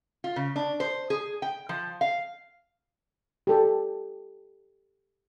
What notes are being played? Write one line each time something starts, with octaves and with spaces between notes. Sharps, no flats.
F4
C#3
D4
C5
G#4
G5
F3
F5
G4 A4